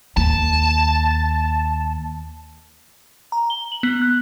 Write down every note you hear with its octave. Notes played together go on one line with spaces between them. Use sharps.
D#2 A5
A#5
G7
F#7
B3
F#6